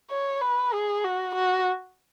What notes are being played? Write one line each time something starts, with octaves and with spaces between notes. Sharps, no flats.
C#5
B4
G#4
F#4
F#4